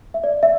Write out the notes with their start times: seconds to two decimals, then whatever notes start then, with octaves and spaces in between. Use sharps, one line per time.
0.14 E5
0.24 D5
0.43 E5